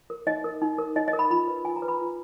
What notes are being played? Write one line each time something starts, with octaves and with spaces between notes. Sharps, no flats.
A#4
D#4 D#5
A#4
D#4
A#4
D#4 D#5
D#5
A#4
B5
F4 B5
B4
F4 G#5
A#5
B4
B5
F4